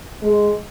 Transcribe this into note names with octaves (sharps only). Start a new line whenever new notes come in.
G#3